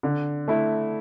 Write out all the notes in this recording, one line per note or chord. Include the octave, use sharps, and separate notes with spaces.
D3
A3 E4